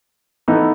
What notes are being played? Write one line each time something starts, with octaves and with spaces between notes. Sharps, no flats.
E3 B3 D#4 A4